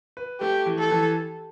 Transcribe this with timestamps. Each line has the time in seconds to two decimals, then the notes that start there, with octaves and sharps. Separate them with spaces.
0.17 B4
0.41 A3 G4
0.66 E3
0.79 A4
0.91 E3